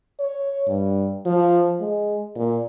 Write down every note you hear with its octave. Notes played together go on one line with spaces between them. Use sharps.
C#5
G2
F3
G#3
A#2